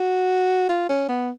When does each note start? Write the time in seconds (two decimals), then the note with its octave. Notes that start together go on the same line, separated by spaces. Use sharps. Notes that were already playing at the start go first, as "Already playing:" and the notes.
Already playing: F#4
0.69 F4
0.89 C#4
1.09 B3